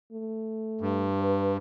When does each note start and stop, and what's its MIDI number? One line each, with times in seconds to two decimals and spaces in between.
0.12 1.10 57
0.81 1.57 43
1.21 1.57 71